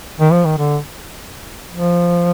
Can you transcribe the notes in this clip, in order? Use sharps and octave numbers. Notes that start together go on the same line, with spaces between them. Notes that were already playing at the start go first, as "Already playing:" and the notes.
D#3
F3
D#3
D3
F3